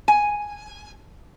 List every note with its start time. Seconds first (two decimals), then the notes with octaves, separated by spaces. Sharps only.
0.08 G#5